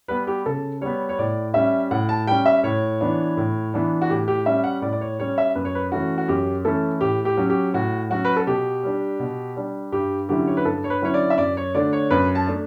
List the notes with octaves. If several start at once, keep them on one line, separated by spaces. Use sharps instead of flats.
G3 B3 B4
G4
C#3 A4
G3 B3 C#5
C#5
A2 D5
G3 C#4 E5
A2 F#5
A5
G3 C#4 G5
E5
A2 C#5
E3 B3 D4
A2
E3 B3 D4
F#4
A2 G4
G4
G3 C#4 E5
F#5
A2 D5
D5
C#5
G3 C#4 C#5
E5
F#2 B4
C#5
B4
E3 A3 C#4 E4 F#4
F#4
F#2 G4
E3 A3 C#4 E4 A4
A2 G4
G4
F#3 C#4
G4
A2 F#4
F#3 C#4 F#4
B4
A4
B2 G4
G3 D4
B2
G3 D4
G2 G4
D3 F#3 C#4 E4 G4
C#5
B4
G2 A4
C#5
B4
D3 F#3 C#4 E4 C#5
D5
E5
F#2 D5
C#5
D3 A3 D4 D5
C#5
F#2 B4
A5
A3 D4